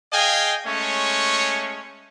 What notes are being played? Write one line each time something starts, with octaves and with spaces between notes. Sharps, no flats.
G#4 D#5 F5 G5 G#5
G#3 A3 C#4 C#5 C#6